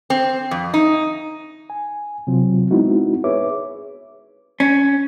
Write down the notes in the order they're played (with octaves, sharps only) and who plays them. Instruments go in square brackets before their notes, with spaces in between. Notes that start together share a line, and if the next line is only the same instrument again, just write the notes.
[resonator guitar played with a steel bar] C4
F2
D#4
[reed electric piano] G#5
C3 F#3 C4 F4
G#3 B3 C4 D#4 E4 F#4
G#4 B4 C#5 E5 D6
[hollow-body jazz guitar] C#4